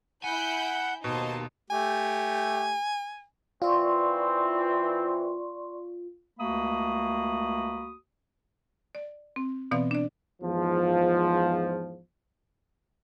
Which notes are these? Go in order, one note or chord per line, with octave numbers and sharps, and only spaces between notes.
E4 F#5 G#5 B5 G6
D#2 B2 D#4 C5 A5
A3 G4 G#5
E3 C4 F4 D5 C6 C#6
C#2 A3 A#3 F#4 B5 D#6
D5
C4
B2 E3 B3 C4 D5 F5
D4 D5
E2 G#2 F3